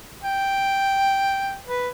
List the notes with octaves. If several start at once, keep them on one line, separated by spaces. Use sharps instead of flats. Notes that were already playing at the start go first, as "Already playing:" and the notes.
G5
B4